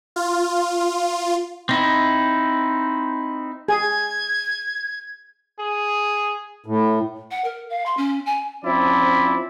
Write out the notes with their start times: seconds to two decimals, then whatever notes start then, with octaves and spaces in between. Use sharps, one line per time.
0.16 F4
1.69 C4 D#4 E4
3.68 G#4 G#6
5.59 G#4
6.66 A2
7.31 F#5
7.44 A#4
7.70 F5
7.86 C6
7.97 C#4
8.26 G#5
8.65 F3 C4 C#4 E4 D5